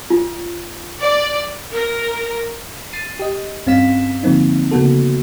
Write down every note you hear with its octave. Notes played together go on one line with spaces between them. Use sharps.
F4
D5
A#4
A6 C7 D#7
G4 D#5
G2 C4 C#4 F5 B6 E7
D3 F3 A#3 C4 D#4
C#3 A#3 B3 F#4 A4